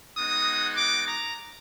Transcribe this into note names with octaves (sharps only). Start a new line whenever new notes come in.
G#3 B3 D#4 F#4 D#6
D6
A#5